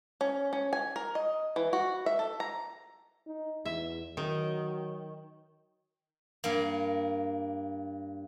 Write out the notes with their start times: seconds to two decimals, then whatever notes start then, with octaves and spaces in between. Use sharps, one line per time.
0.21 C#4
0.53 C#4
0.73 G#5
0.96 A#4
1.15 D#5
1.56 E3
1.73 F#4
2.06 E5
2.19 A4
2.40 A#5
3.27 D#4
3.65 E2 E5
4.17 D#3 F#3
6.44 G2 A#3